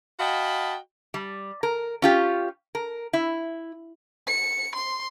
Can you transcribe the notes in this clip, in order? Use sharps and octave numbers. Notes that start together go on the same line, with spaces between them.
F#4 D#5 F5 G5 A5 B5
G3
A#4
C#4 F4 G4
A#4
E4
C#7
C6